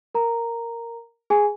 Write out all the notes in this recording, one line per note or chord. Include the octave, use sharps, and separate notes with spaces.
A#4 A#5
G#4 G#5